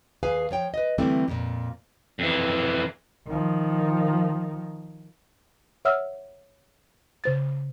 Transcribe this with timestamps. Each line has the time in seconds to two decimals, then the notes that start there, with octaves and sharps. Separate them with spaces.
0.23 D#2 G#4 B4 F5 G#5
0.51 F3 C#5 G5
0.74 B4 D#5
0.98 D3 E3 G3 A3 C4 E4
1.28 F2 A#2
2.19 F2 E3
3.27 D#3 F3
5.85 C#5 E5 F#5 E6 F6
7.24 C#3 C5 A6